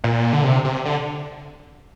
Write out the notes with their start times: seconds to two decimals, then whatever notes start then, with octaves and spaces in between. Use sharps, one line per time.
0.04 A#2
0.33 D3
0.44 C3
0.65 C3
0.85 D3